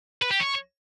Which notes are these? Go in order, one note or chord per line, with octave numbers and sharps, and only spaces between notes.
B4
G4
C#5